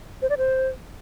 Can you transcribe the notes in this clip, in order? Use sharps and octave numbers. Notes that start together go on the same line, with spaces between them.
C5
D5
C5